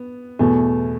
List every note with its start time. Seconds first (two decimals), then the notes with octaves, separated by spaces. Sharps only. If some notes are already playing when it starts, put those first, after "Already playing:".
Already playing: B3
0.39 E2 B2 A3